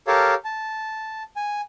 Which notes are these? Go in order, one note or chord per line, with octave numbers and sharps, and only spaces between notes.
G4 A4 A#4 C#5 F5 A5
A5
G#5